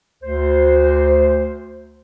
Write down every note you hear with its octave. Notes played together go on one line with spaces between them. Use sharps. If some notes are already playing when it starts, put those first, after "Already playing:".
D2 C5